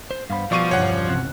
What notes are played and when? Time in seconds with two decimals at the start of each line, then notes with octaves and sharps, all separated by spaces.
0.11 C5 C7
0.30 G2 B3 C5 F5 B5
0.52 B2 F3 G3 D5 C#6 D#7
0.71 E1 C#2 G2 C#5 F#5
1.09 C3 F#6